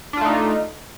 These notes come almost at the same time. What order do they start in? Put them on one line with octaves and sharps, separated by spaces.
D4 F4 A3 D#4